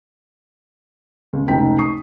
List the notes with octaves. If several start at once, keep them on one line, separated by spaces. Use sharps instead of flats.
C#2
F1 C#2 D#4 G5 B6
C#6 D#6 C7